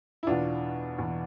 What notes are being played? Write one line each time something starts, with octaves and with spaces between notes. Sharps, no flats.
E4
E2 B2 D4 F4
E2 B2